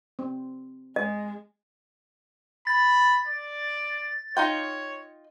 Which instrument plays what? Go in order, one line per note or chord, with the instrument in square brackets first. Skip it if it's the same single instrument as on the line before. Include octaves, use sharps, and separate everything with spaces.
[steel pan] C4
[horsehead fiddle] G#3 [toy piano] D#5
[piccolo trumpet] B5 [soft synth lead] A6
[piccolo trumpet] D5
[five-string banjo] D#4 F4 G5 [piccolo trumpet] C#5